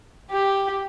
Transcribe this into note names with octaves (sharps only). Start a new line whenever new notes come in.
G4